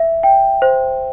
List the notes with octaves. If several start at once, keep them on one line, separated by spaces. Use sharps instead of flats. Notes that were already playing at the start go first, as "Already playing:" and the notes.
Already playing: E5
G5
C5